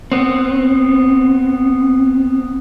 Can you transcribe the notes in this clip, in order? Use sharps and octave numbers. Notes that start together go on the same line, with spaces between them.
B3 C4